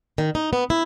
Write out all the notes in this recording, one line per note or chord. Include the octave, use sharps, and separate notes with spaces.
D#3
D#4
B3
E4